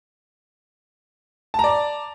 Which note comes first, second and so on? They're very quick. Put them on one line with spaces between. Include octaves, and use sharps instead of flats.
A5 A#5 D5